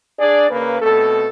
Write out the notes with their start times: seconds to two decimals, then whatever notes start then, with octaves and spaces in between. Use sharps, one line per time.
0.20 D4 G#4 D5
0.51 C#3 A#3 A#4 B4
0.81 B2 A3 C4 A4